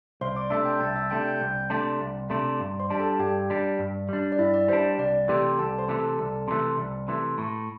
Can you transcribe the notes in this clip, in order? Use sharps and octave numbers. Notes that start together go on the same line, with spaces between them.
C2 C5 C6
D5 D6
C3 A3 D4 E5 E6
G5 G6
C2 A5 A6
E5 E6
C3 A3 D4 G5 G6
G5 G6
C2 G5 G6
C3 A3 D4
C2
C3 A3 D4
G2
C5 C6
G3 D4
A4 A5
G2 G4 G5
G3 D4
G2
G3 D4
D5
G2 E4 E5
D5
G3 D4 C5
C2 D5
C3 E3 A3 G4 G5
C2 A4 A5
C5 C6
C3 E3 A3
A4 A5
C2 A4 A5
C3 E3 A3
C2
C3 E3 A3
A2